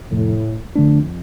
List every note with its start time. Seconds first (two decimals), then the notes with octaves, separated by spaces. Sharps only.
0.11 F2 A2 C3 F3
0.76 F2 D3 A3 D4